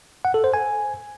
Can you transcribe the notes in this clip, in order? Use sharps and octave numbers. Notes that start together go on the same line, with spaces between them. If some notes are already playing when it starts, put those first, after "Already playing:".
F#5
A4
C5
G#5